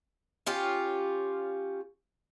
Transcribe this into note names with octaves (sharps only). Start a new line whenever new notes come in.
C#4 F4 G4